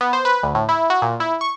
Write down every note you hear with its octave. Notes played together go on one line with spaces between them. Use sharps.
B3
C5
B4
D2
A2
E4
F#4
A#2
E4
C#6